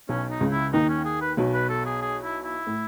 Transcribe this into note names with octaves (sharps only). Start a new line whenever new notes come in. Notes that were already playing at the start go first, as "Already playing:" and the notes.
B1 B2 C#4
D#4
C#2 C#3
E4
D#2 D#3 D#4
C#4
G#4
B4
B1 B2
B4
A4
G#4
G#4
E4
E4
A2